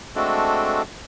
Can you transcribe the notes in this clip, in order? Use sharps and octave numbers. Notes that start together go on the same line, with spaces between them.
G#3 A3 C4 D4 F#4 A4